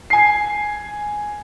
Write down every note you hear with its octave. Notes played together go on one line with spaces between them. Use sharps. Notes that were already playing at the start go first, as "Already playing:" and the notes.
G#5 C7